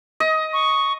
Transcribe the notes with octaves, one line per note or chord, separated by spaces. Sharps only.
D#5
C#6